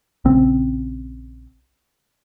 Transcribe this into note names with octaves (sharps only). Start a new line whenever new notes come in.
A#1 C#3 C4